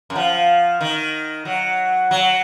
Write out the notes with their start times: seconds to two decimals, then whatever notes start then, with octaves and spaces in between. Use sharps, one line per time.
0.10 F#2
0.16 F3
0.81 D#3
1.45 F#3
2.11 F#3